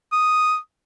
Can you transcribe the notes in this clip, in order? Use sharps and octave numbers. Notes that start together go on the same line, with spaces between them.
D#6